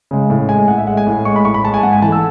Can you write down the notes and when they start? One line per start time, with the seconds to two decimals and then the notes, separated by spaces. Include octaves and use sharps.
0.11 C#3 G#3
0.30 A2
0.48 G#3 G#5
0.68 A2 F#5
0.78 E5
0.87 G#3 F#5
0.97 G#5
1.07 A2
1.25 G#3 C#6
1.36 B5
1.45 A2 C#6
1.54 B5
1.64 G#3 A5
1.74 G#5
1.83 G#2 F#5
1.92 G#5
2.02 E3 A3 A5
2.12 E6